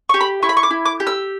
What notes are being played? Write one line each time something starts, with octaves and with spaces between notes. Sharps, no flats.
G4 C#6
B5
E4 C#6
B5
C#6
D6
E4
D6
G4
E6